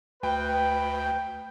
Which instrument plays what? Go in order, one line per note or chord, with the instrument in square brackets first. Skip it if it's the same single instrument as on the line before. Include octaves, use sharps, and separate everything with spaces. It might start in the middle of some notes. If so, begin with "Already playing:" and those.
[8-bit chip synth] D2 [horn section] B4 [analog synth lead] G5